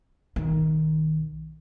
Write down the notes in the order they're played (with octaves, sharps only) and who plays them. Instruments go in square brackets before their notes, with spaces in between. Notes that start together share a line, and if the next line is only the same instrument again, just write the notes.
[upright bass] B1 D#3